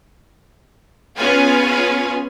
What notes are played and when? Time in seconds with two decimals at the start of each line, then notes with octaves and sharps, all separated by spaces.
1.16 B3 C#4 F4 G#4 B4 G#5